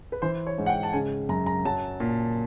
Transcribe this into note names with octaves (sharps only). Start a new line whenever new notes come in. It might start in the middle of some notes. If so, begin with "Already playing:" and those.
B4
E3 C5
C#5
G#2
F#5
G5
A5
C#3 G#5
F#2 A#5
A#5
F#3 A5
A#2